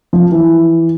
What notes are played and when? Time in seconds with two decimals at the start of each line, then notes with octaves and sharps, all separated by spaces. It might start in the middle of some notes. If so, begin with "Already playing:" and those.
0.13 F3
0.32 E3